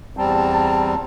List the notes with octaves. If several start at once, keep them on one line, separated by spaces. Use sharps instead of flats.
E2 G3 C4 A5 A#5